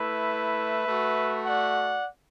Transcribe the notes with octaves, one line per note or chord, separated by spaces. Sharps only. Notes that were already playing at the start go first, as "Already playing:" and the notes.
Already playing: A3 E4 B4 E5
A3 F#4
D5 F#5